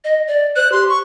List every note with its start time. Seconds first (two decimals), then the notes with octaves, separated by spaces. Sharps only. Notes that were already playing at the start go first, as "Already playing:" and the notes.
0.04 D#5
0.27 D5
0.56 C5 F#6
0.72 G4 C6
0.89 C#6